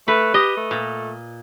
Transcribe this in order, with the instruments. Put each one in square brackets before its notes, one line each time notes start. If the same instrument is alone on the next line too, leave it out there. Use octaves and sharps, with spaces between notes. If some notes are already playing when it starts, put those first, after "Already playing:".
[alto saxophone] A3 [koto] B4
[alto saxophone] G4 [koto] D#5
[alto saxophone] A3
[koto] A#2